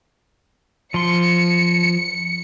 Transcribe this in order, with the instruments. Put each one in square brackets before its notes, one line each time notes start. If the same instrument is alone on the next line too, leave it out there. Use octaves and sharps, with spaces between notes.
[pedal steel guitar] F3 C6 [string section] C#7